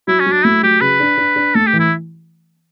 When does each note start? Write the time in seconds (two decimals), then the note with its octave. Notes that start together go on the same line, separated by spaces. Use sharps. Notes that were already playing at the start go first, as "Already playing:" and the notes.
0.07 F#3 E4
0.20 C#4
0.26 F#3
0.32 D4
0.44 A3 E4
0.63 F#3 G4
0.81 C#3 B4
1.00 D4
1.17 D4
1.36 D4
1.55 A3 A4
1.67 G4
1.73 E3
1.80 E4